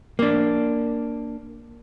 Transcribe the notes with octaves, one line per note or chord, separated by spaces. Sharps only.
A#3 D4